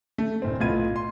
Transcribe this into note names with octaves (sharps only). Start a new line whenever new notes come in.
A3
D1 C4
B1 A2 B3 F4 G#6 D#7
C6